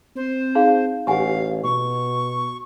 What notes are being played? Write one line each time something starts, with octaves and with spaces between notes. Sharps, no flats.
C4 C5
D#4 G#4 F5
A1 G4 F5 F#5 G#5
B2 C#6